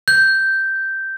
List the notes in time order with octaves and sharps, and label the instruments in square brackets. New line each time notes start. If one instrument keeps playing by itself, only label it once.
[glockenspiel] G6